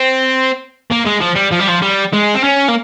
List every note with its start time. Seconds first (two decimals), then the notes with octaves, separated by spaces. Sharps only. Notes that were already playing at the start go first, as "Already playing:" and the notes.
Already playing: C4
0.92 A#3
1.07 G#3
1.22 F3
1.37 G3
1.52 F3
1.61 G3
1.69 F3
1.83 G3
2.13 G#3
2.34 C4
2.43 C#4
2.68 A#3